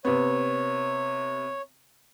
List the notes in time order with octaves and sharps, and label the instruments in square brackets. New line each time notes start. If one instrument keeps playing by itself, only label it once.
[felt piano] C3 B3 [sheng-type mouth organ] C#5